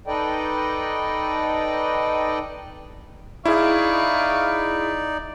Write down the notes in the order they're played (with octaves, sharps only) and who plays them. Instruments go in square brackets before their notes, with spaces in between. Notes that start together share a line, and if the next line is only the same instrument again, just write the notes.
[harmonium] D#4 A4 B4 D5 D#5 G5
[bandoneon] D#4 D5 [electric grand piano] E4 G#4 [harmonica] F5 C#6